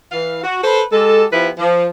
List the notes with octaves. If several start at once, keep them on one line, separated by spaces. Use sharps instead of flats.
E3 F5
F#4
A4 B4 C5
G#3 G4 A4
F3 B3 E4 G4 B4
F3